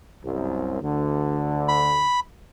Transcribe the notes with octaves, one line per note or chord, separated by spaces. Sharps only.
C2 F#2
D2 D3
B5